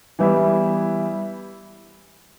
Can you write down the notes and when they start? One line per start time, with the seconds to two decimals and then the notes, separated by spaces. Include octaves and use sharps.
0.19 E3 G3 B3 E4